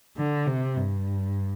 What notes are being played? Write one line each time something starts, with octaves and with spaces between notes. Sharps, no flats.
D3
C3
G2